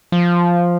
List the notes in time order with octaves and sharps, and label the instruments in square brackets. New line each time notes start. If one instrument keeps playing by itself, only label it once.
[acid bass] F3